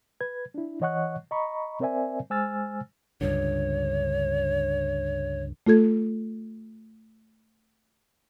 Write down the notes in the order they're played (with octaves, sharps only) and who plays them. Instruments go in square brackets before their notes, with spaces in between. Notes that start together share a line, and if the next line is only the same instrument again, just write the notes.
[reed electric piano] B4 G#6
D4 E4
E3 C#5 D#5 F#5 C#6 F#6
D#5 A#5 B5 C#6
C4 A#4 C5 D5 E5 G#5
G#3 C5 G#5 E6 F6 A6
[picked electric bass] C#2 G2 D3 [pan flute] C#5
[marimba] A3 F4 A4 G#6